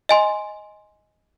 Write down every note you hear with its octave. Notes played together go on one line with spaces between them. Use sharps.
D#5 G#5 C6